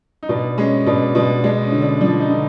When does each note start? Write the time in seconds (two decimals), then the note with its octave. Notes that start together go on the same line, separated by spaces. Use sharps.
0.23 D#4
0.29 B2 D4
0.58 G#3 C#4
0.86 B2 D4
1.15 B2 D4
1.44 G#3 D4
1.63 C#4
1.72 D3
1.82 D4
2.01 F3 D4
2.20 D#4
2.30 D3